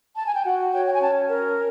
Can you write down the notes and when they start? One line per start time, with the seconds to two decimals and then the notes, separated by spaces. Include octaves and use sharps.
0.15 A5
0.25 G#5
0.35 G5
0.45 F#4 F#5
0.73 C#5 G5
0.86 G5
0.93 G#5
1.00 C#4 A5
1.28 A#4